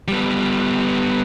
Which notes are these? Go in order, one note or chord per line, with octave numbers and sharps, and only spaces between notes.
G3 B3